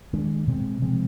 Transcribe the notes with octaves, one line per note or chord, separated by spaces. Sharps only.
D#3 G#3 D4
B2 G#3 C4
C3 F3 G#3 C4